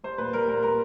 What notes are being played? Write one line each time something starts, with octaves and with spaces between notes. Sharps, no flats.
G3 C5
A#2 B4
G3 A#4
A#2 A#4
A#2 A#4